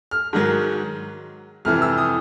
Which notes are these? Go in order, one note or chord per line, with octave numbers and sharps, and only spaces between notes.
F6
G#2 D#3 F#3
F2 C3 E3 F6
E6
D#6